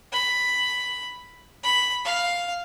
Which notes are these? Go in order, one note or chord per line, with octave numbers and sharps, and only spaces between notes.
B5
B5
F5